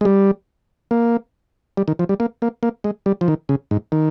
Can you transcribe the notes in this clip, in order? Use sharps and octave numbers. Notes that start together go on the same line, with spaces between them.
G#3
G3
A#3
G3
D#3
F3
G3
A#3
A#3
A#3
G#3
G3
F3
D#3
C#3
G#2
D#3